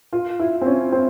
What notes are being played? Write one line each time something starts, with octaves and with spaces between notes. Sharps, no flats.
F4
E4
C4
C#4
C4